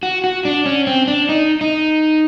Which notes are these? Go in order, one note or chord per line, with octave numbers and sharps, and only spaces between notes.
F#4
F#4
D4
C#4
C4
D4
D#4
D#4